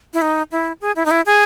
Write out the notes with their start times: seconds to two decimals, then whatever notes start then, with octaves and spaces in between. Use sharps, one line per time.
0.14 E4
0.22 D#4
0.52 E4
0.81 G#4
0.96 E4
1.06 D#4
1.11 E4
1.26 G#4